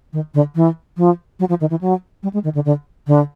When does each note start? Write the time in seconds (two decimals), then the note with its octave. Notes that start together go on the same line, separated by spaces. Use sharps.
0.13 D#3
0.34 D3
0.55 E3
0.97 F3
1.39 F#3
1.49 F3
1.60 D#3
1.70 E3
1.81 F#3
2.23 G3
2.33 G#3
2.44 D#3
2.55 D3
2.65 D3
3.07 D3